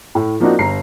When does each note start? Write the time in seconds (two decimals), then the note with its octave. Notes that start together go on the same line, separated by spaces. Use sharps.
0.15 A2
0.40 F3 A#3 C4 D4 D#4 F#4
0.59 G1 A#5 C7